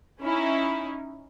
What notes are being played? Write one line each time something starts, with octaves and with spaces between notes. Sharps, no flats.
C#4 D#4 E4